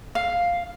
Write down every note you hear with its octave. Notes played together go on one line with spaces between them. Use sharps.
F5